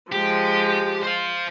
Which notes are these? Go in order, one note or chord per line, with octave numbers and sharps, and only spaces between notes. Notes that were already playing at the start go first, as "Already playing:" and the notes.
F3 G#3 G4
C5 F5